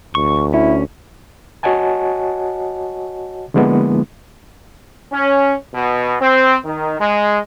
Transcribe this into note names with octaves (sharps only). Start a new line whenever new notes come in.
D2 C#6
C#4 E4
F#4 C#5 D#5 F#5 G#5 A5
D3 F3 G#3 A#3 B3 E4
C#4
B2
C4
D#3
G#3